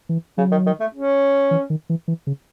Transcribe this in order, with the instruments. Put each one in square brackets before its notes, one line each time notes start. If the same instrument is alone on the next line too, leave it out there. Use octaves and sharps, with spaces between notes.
[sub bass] E3
[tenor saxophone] C#3 [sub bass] F#3
[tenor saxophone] D#3
D#3
A3
C#4
[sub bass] E3
D#3
E3
E3
C#3